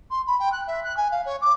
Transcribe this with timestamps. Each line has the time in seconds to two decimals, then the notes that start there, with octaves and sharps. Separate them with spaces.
0.11 C6
0.27 B5
0.39 G5
0.52 F#6
0.67 E5
0.84 F#6
0.97 G#5
1.11 F5
1.25 C#5
1.41 D6